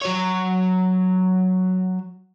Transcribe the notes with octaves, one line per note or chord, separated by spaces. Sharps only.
F#3 C#5